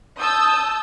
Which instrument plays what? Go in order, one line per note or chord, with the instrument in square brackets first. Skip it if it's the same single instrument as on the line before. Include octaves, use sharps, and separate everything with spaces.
[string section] A5 D#6 E6 G6